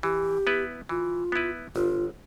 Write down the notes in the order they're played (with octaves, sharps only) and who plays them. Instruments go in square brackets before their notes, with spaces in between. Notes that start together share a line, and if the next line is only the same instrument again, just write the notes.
[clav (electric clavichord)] E3 [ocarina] G4
[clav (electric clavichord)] B3 E4 B4
[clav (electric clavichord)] E3 [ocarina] F4
[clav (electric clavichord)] B3 E4 B4
[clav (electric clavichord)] G1 [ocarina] F4